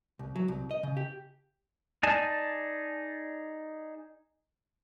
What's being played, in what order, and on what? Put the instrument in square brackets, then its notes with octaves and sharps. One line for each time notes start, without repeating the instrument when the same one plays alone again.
[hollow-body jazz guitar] C2
F#3
C2
D#5
C#3
G4
[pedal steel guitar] D#4 G#4 D5 G#5 A5